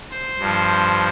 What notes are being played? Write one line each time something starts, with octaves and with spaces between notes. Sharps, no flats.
C5
G2 F3